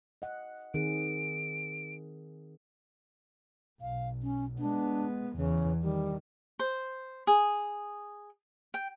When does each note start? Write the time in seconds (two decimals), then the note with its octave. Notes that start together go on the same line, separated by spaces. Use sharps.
0.22 D#5 F#5
0.74 D#3 C4 G#4 D7
3.81 B1 F5
4.23 C#4
4.59 G#3 B3 D4
5.36 E2 C#3 E3
5.82 D#3 G3
6.59 C5
7.27 G#4
8.74 G5